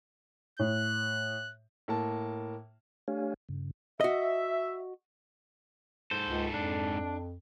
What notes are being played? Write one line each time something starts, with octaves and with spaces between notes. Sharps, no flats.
A2 F#6
A2 A#3 A5
A3 D4 G4 C#5 F5 G#5
G2 C#3
F#4 D#5 E5
G#2 A4 C5
C#2
F2 D4